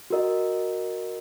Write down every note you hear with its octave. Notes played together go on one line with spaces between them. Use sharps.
F#4 A#4 D#5